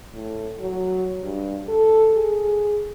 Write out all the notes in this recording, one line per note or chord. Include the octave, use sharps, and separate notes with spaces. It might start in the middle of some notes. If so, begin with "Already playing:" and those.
A2
F#3
G2
A4
G#4